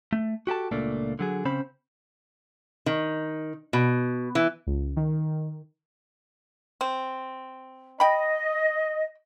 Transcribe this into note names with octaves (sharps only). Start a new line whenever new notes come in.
A3
F#4 G4 A4 A5
C#2 A#2 A3 A#3 D4
D3 F#3 G#4
C#3 C4 C#4 C5 B5
D#3
B2
E3
C#2
D#3
C4
D#5 G5 B5